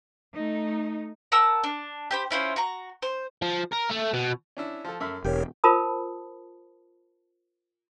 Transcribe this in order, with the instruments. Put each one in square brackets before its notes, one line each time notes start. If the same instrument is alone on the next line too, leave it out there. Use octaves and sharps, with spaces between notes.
[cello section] A3 D#4
[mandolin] A#4 F#5 A5 E6
D4
G4 C5 B5
C#4 E4 F4 C5
F#4 A#5
C5
[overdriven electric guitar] F3
A#4
A3
B2
[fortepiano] C#4 D4 E4
F3 A4
F#2 A4 E5
[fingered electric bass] E1 [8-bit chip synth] G4 A#4 C#5 [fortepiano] G5
[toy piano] F4 A#4 C5 A5 B5 D#6